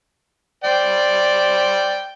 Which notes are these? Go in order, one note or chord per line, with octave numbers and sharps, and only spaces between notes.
C5 D5 G5